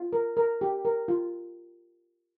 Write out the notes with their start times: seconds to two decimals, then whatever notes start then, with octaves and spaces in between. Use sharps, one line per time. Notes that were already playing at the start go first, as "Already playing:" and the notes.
Already playing: F4
0.13 A#4
0.37 A#4
0.61 G4
0.85 A#4
1.08 F4